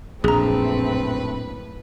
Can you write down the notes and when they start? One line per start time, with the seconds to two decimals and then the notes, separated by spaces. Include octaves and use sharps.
0.24 A#1 F#2 A2 A3 C4 G#4 B4 A#5